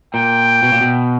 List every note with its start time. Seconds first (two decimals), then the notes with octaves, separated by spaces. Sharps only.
0.14 A#2 G5
0.63 B2
0.72 A#2
0.81 B2